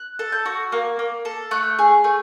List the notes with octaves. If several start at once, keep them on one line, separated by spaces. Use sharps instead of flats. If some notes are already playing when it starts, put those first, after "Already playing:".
Already playing: F#6
A4
G6
F#4
A#3
A#3
A4
A3 F#6
G#4
A3